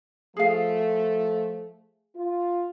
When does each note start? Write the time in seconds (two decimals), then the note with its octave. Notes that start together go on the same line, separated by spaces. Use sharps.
0.37 F3 A3 G#4 F5
2.16 F4